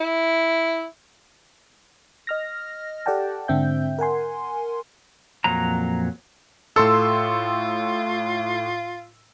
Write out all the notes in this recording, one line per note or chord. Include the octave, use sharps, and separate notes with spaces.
E4
D#5 F6 A#6
G4 A4 D5 F#5 G5 A5
G#2 D3 C4 E5 G5 G6
A#4 F#5 G#5 C6
F2 A#2 F#3 A#5
A2 F4 A4 C6 E6